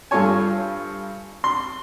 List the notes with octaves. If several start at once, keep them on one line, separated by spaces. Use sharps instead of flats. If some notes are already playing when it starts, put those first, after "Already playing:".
G2 F4 A4 C#5 G#5
C6